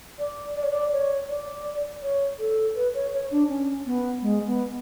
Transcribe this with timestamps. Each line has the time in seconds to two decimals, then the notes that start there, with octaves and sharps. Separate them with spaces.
0.19 D5
0.56 D5
0.63 C#5
0.71 D5
0.93 C#5
1.29 D5
2.03 C#5
2.39 A4
2.76 B4
2.94 C#5
3.13 C#5
3.31 D4
3.49 C#4
3.86 B3
4.22 G#3
4.47 B3